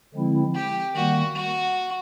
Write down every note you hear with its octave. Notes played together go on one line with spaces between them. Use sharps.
D3 F3 G#3 C4 E4
G4
D#3 G3 A#3 F#4
F#4